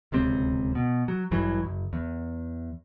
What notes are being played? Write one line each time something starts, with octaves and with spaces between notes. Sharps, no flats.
D1 C#2 C3 C4
B2
F#3
A1 G2 E3 F#3
F#1
E2